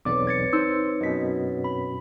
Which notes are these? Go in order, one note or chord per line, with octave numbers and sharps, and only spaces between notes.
B1 E2 C4 B4 C#5 D5 D6
G#6 A6 C#7
D#4 C5 E6
F#2 B2 D#5 B6
B5